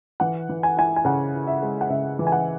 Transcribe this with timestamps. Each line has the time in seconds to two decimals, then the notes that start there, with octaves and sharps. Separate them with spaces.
0.20 E3 F#5
0.49 E3
0.63 G#5
0.77 E4 G#5
0.96 G#5
1.05 C#3 F#5
1.34 E4
1.47 E5
1.62 G#3
1.81 F#5
1.90 C#3 E5
2.19 E3
2.27 G#5
2.32 F#5